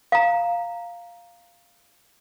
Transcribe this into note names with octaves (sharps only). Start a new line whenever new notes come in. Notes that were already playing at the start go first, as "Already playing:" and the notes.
F5 A#5